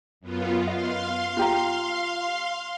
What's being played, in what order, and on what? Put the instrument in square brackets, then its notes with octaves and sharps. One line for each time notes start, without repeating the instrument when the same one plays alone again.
[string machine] F#2 B3 F4
[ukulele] D#5 [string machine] F5 C6
[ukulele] F4 G4 A#5